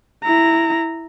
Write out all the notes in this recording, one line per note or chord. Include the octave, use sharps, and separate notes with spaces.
E4 A#5